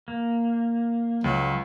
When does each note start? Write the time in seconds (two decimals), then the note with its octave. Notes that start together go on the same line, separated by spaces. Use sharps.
0.08 A#3
1.24 C#2 F#3